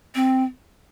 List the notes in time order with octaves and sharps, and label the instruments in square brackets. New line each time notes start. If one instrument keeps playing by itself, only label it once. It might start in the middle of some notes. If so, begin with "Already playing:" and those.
[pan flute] C4